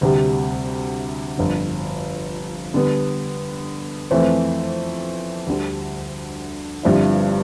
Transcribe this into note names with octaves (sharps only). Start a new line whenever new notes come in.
D2 C3 G3
G1 F2 D3
D3 G3 B3
F2 E3 A3 C4
D2 D3 G3
G1 G2 F3 C4 E4